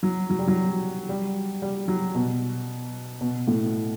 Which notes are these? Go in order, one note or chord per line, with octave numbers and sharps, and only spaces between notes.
F#3
F#3
G3
F#3
G3
G3
F#3
B2
B2
A2